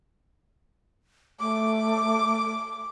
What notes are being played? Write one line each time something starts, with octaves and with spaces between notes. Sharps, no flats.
A3 D6